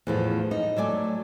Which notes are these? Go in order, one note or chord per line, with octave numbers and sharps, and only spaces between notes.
E2 A2 F3
D#4
F#3 A3 D5 G#5